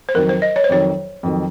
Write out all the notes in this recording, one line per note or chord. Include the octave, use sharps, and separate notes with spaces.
C5
F2 D#3 F#3 A#4
C5
D#5
C#5
C5
F2 D#3 F#3 C#5
F2 D#3 F#3